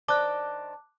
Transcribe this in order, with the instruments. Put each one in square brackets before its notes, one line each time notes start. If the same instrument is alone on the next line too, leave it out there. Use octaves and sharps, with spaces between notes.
[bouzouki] D#3 D4 C5 [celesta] A5 [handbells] D6 F#6